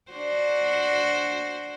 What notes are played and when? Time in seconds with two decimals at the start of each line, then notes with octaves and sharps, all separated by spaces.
0.12 D4 F#4 C5